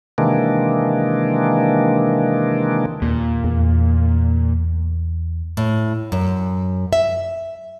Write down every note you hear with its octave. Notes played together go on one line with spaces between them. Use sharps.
C3 D#3 E3 G#3 A#3 D4
D#2 A#2
E2
A2
F#2
E5